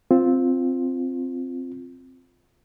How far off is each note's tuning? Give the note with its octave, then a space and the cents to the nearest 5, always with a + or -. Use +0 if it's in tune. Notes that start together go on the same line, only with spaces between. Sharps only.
C4 +0 F4 +0